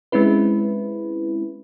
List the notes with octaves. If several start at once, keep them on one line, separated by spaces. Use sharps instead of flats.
G#3 C4 C#4 E4 B4